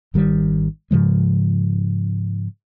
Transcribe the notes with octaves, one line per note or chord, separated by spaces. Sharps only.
G#1 D#3 G3
G#2 C#3 F3 G#3